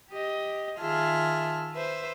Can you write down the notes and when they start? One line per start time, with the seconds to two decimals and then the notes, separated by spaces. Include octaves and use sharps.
0.10 G4 D#5
0.79 D#3 F4 G#4 E5 A5 F6
1.73 B4 C5 E5